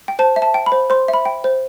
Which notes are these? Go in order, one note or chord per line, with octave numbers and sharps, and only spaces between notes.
G5
C5 A5
E5
A5
G5
B5
C5
C5 C6
E5
B5
G5
C5